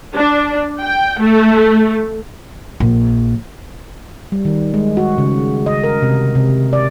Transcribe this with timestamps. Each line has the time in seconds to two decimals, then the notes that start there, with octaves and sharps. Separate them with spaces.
0.14 D4
0.81 G5
1.20 A3
2.80 A#1
4.32 G3
4.45 D#3
4.74 G#3
4.97 F#4
5.18 C#3
5.66 D#5
5.84 A#4
6.03 C3
6.35 C3
6.73 D5